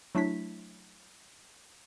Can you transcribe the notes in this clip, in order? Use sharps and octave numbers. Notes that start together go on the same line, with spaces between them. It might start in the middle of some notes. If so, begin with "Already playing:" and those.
F#3 A3 D4 E4 B6